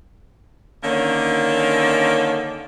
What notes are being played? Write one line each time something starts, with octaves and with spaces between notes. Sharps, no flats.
D3 D#3 A#3 C#4